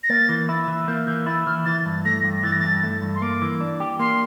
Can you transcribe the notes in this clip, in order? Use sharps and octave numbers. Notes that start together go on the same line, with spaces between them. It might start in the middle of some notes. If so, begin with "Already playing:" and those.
A#6
A#3 A6
E3
E4
E3
A#3 G6
E3 G6
E4 A6
E3 F6
E3 A6
G2
A3 A#6
G2
E3 A6
A#6
G2 A6
A3
G2
C6
A#3 D6
E3
D4
G4
A#3 C6